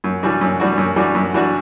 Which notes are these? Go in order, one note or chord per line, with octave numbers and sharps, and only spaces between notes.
F#2
E3 G3 D4 F#4
F#2
E3 G3 D4 F#4
F#2
E3 G3 D4 F#4
F#2
E3 G3 D4 F#4